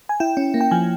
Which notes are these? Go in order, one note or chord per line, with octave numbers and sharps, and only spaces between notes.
G#5
E4 G5
C#4
A#3
G5
F3 G#5